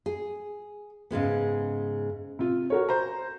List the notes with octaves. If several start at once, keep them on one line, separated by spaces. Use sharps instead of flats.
G#4
G#2 C#3 G#3 B3
C3 F4
F#4 A#4 C#5
C5 A#5